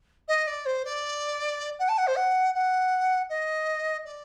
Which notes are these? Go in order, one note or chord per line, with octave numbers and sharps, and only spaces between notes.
D#5
D5
C5
D5
F#5
A5
F#5
C5
F#5
F#5
D#5
D5